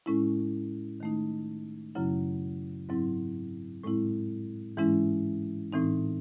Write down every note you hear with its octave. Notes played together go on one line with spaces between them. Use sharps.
A2 G#3 C#4 E4
D#3 A3 D#4
F#2 C#3 F#3 C#4 E4
G#2 F#3 C4 E4
A2 G#3 C4 E4
G#2 E3 G#3 C#4 E4
A2 E3 C4 D#4